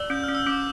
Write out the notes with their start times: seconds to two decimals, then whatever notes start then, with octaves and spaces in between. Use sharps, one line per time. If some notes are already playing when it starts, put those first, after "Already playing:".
Already playing: D5 E6
0.10 C#4 G6
0.24 C#4 F6
0.35 E6
0.47 C#4 D6